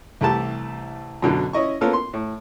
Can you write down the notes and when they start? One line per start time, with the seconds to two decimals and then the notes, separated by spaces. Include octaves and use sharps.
0.21 C2 E3 A3 E4 G4 A5
1.22 F#2 B2 D3
1.53 C#4 E4 D#5 C#6
1.81 A#3 B3 C#4 F4 A4 A#4
1.93 C6
2.13 A2